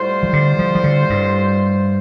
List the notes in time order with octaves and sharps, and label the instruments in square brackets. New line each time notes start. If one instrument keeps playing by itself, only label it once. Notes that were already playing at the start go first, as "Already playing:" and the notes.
Already playing: [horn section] A2 G3 F4 C5
[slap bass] F3
D3
F3
F3
D3
G2